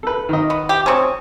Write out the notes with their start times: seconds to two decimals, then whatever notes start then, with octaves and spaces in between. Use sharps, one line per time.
0.03 A4 B4
0.29 D#3 D#5
0.50 B3
0.69 G4
0.86 C4 C#4 G#5 C#6 D#6